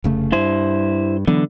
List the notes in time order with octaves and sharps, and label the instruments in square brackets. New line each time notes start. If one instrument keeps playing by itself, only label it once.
[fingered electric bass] F1 C#3 A3
[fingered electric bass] G2 [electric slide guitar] E4 C5
[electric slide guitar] D3 [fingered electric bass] E3 F#3 B3